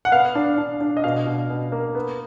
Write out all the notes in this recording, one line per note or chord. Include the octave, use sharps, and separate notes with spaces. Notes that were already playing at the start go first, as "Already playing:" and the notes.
F#5
B3 F5
D4
D4
D4
D#5
B2 F5
B2
B2
A#3
B3